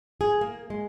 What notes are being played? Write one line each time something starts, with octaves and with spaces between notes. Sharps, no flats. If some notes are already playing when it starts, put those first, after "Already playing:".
G#4
A#3
G#3